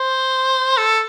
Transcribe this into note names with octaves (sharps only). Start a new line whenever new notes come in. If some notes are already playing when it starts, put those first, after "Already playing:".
Already playing: C5
A4